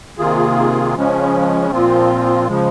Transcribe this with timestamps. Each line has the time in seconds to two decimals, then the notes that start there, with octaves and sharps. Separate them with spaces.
0.18 C3 D#3 A#3 F4 G#4
0.95 C#3 F3 G#3 C#4
1.71 A#2 F3 C4 F4
2.48 C#3 F3 G#3